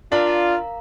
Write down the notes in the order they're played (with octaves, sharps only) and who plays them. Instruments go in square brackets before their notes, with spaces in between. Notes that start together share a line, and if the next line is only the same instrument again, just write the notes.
[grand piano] D4 [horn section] F4 [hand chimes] A#4 F5 A#5